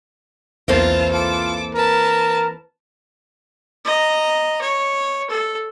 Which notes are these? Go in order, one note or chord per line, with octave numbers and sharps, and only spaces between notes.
B1 E2 E3 A#3 C4 F4 A5
F4 A4 D6
A#4 B4 A5
D#5 A#5
C#5
A4